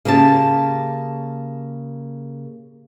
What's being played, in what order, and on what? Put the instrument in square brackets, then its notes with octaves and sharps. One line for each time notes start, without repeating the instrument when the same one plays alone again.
[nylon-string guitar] C#3 A#3 G4 A5